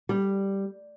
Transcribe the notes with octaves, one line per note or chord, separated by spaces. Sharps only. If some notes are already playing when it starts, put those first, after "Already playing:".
G3